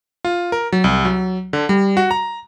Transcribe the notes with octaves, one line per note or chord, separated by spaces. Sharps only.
F4
A#4
F#3
C2
F#3
D3
G3
F#4
A#5